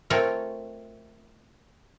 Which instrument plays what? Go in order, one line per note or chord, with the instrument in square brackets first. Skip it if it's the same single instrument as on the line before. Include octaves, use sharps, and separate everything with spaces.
[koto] A3 C4 F4 A#4 C#5 D#5